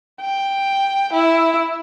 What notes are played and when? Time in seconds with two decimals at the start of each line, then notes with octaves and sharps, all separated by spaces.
0.21 G5
1.13 E4